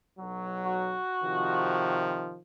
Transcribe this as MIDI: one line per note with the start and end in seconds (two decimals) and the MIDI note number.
0.18 0.97 35
0.18 0.97 54
0.65 1.99 66
1.23 2.39 48
1.23 2.39 51
1.23 2.39 53